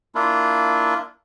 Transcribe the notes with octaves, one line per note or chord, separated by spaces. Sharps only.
A#3 D4 E4 F4